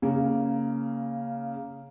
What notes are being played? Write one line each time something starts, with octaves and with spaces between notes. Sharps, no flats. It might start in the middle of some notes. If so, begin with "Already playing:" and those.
C#3 A#3